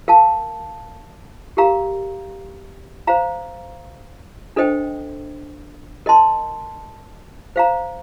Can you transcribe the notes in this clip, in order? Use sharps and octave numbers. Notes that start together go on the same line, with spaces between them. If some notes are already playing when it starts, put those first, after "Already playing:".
A#4 F5 A5
G4 A#4 F5 A#5
C5 F5 A#5
D4 A4 C5 D#5 G5
A#4 D#5 A5 C6
C5 F5 A#5